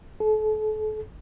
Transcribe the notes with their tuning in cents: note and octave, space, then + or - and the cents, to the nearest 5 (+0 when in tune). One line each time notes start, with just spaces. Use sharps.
A4 -35